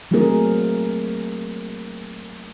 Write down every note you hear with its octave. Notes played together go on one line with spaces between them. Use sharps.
F#3 A3 A#3 C4 G#4 A#4